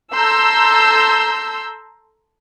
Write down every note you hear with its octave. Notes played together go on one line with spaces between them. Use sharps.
A4 A#5 C6 E6 G6